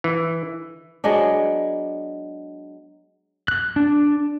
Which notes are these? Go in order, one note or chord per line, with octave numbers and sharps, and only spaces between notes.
E3
F#3 G#3 B3 D4
F#6
D4